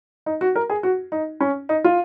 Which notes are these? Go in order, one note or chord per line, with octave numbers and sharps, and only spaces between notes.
D#4
F#4
A#4
G#4
F#4
D#4
C#4
D#4
F4